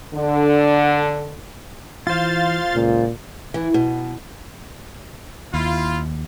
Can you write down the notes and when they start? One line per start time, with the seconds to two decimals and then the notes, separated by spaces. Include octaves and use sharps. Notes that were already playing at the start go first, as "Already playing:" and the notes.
0.14 D3
2.07 E3 F4 C5 F5 C6 A6
2.75 C#2 A#2
3.54 E3
3.74 B2
5.54 D#2 E4 F4